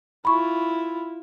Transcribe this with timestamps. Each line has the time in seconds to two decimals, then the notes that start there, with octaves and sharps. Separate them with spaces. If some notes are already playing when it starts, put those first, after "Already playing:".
0.25 E4 F4 B5 C#6